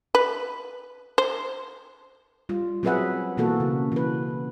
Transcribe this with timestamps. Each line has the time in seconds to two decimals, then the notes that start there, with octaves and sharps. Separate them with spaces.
0.15 B4
1.18 C5
2.49 G3 F4
2.83 F#3 C4 G#4 B4 E5 F#5
3.37 B2 E3 A#3 F#4 A4
3.60 C#3
3.92 E3 B4